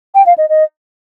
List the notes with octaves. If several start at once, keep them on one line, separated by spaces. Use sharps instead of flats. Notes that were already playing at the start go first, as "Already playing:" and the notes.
G5
F5
D#5
D#5